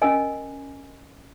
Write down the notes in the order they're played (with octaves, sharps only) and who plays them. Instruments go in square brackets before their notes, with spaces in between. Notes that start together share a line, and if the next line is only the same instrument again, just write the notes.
[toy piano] C#4 A#4 D#5 G#5